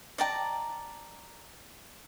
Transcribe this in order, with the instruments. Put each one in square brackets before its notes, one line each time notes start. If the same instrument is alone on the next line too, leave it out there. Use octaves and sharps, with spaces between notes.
[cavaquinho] D5 A5 A#5 [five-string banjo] D#5 G5